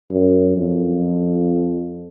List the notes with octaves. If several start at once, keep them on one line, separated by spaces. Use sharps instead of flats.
F#2
F2